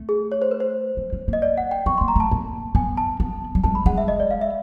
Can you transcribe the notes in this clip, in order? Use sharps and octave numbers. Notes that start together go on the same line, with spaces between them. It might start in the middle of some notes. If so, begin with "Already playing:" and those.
Already playing: A3
G#4
C#5
C5
B4
C5
G#3
G#3
A#3
D#5
D5
F#5
G5
B3 C#6
C6
A#3
A#5
A3 A5
A#3
B3 G#5
A5
B3
G3
G#3 A5
B5
G#3 F#5
E5
D#5
D5
F5
E5